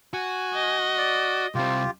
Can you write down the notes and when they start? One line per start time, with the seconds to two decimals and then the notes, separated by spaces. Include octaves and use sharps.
0.13 F#4 G#5
0.54 D#5
0.98 D5
1.55 C2 C4 F4 G4